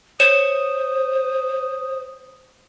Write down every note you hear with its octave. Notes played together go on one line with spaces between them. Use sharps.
C5 C#5 D#6 E7